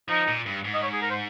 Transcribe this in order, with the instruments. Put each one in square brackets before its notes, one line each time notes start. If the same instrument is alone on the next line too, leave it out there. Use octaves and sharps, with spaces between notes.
[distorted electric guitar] F3 [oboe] D#4
[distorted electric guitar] A#2
G2
G#2
[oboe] D#5
C#5
G#4
A#4
C5